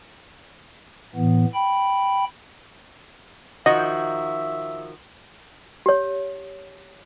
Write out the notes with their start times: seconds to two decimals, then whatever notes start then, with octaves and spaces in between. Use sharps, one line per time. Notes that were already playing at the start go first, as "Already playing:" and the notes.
1.15 A2 E3 B3
1.54 G5 B5
3.66 D#3 F3 F#4 D#5 E5
5.86 G4 C#5